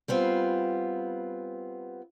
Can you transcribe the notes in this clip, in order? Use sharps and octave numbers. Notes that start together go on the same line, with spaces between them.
G3 B3 C4 F4